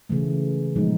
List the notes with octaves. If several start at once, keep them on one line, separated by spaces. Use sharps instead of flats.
C#3 E3 A3
A#2 F3 G#3 B3 D#4